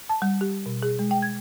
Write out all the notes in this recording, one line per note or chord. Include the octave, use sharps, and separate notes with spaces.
A5
G3
G4
B2
G#4
G#3
G5
G#6